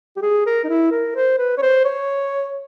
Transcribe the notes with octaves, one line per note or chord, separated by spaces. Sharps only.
G4
G#4
A#4
D#4
E4
A#4
C5
B4
C#5
C5
C#5